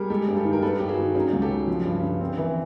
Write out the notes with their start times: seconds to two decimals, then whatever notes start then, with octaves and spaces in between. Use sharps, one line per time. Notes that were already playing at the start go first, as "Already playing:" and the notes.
Already playing: G3 G#4 A#4
0.10 G#3 G4 A4
0.28 G2
0.36 G4 A4
0.45 D#3
0.53 A#4
0.62 G3 A4 B4
0.79 G2 G4
0.89 F#4 G#4
0.98 D#3
1.15 F#3 C#4 D#4
1.33 C#2
1.42 G4 A4
1.50 C#3
1.68 F3
1.85 G2
2.03 D3
2.21 C4
2.38 E3